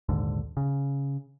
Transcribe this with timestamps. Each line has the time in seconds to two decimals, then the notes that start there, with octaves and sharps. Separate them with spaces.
0.09 A#1 D#2 G#2 D3
0.57 C#3